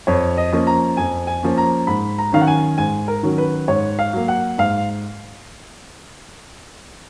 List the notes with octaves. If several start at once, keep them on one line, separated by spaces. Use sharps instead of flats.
F2 C#5
D#5
F3 A#3 C#4
A#5
F2 G#5
G#5
F3 A#3 C#4
A#5
G#2 B5
A#5
D#3 F#3 C#4 F5
F#5
G#5
G#2 G#5
A#4
D#3 F#3 C#4
B4
G#2 C#5
F5
F#3 A#3
F#5
G#2 F5